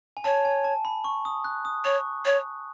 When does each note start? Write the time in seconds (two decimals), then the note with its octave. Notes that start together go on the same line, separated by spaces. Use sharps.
0.17 G#5
0.24 C#5 A5
0.45 G#5
0.64 A5
0.85 B5
1.04 C#6
1.25 D#6
1.44 F#6
1.65 D#6
1.85 C#5 C#6
2.25 C#5